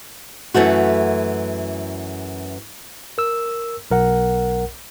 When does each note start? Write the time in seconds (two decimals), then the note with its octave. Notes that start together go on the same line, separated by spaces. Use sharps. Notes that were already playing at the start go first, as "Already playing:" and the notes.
0.54 F#2 E3 A3 F#4
3.18 A#4 E6
3.91 B1 A#4 F#5